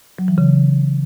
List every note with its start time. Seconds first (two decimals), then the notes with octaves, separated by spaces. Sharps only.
0.19 F#3
0.28 E3
0.38 C#3